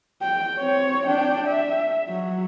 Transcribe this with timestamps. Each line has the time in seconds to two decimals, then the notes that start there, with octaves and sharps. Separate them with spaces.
0.22 G5
0.58 C4 C#5
1.07 D4 G5
1.47 E5
2.09 F#3